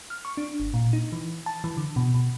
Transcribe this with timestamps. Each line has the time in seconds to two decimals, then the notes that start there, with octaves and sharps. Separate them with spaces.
0.10 F6
0.25 C#6
0.37 D4
0.60 G1
0.74 A#2
0.93 D#4
1.12 E3
1.46 A5
1.64 E3
1.77 D3
1.96 B2
2.14 B2